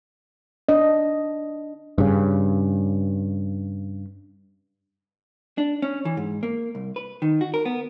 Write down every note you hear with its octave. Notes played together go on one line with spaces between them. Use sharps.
D4 D#5
G2 C#3
D4
C#4
E3
G#2
A#3
C2
B4
D#3
F#4
A#4
B3